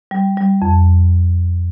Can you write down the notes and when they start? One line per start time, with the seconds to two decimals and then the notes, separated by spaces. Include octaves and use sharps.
0.11 G3
0.37 G3
0.62 F2